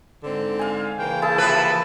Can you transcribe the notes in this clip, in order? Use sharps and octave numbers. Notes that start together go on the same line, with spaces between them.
G#2 D3 C4
F5 G#5
C#3 E3 A#3 G5
E4 G#4 A5
C3 F3 B4